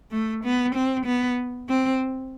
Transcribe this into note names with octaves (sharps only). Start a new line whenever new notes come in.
A3
B3
C4
B3
C4